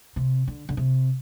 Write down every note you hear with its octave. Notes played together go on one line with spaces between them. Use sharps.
C3
D3
D3
C3